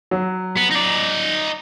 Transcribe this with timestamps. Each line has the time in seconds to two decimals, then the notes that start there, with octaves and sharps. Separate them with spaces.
0.11 F#3
0.57 B3
0.71 D#4 D5